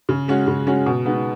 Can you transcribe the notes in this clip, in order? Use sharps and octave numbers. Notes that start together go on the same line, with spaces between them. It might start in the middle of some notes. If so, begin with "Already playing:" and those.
C#3
G#3 C#4 F#4
C#3
G#3 C#4 F#4
B2
G#3 B3 D#4